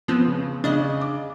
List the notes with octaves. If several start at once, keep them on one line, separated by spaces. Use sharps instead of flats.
F3 B3 C4
C#3
C#3 D4 D#5
D6